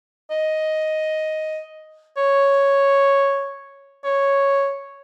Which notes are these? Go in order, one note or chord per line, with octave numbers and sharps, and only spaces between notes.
D#5
C#5
C#5